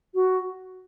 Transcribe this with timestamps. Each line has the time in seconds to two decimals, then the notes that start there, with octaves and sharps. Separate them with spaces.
0.14 F#4